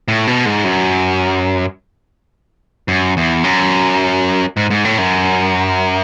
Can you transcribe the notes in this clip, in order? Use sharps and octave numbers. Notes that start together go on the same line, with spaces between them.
A2
B2
G#2
F#2
F#2
E2
F#2
G#2
G#2
A2
F#2